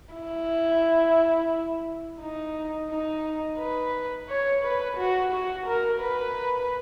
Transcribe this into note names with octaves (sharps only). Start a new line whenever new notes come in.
E4
D#4
D#4
B4
C#5
B4
F#4
F#4
A#4
B4